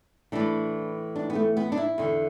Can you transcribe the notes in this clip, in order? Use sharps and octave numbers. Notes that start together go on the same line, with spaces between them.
A2 E3 D4
D4
B3
A3
B3
D4
E4
E2 D3